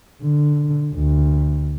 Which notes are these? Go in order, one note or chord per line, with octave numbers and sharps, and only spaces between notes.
D3
D2